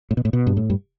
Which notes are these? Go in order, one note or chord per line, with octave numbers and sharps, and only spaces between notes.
A2
B2
A2
B2
G2
A2
G2